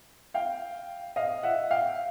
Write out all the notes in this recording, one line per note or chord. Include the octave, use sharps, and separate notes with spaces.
F5 G5
D#5 F5
E5 F#5
F5 G5